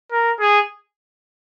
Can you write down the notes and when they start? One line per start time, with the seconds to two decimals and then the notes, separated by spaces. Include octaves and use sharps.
0.12 A#4
0.40 G#4